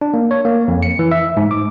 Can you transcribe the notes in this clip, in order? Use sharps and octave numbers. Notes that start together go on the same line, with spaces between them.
D4
A#3
C#5
A#3
F2
C#7
E3
E5
G#2
D6